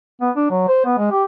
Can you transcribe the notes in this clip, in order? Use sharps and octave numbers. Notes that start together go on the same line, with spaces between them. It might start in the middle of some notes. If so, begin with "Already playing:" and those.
B3
D4
F#3
C5
B3
G#3
G4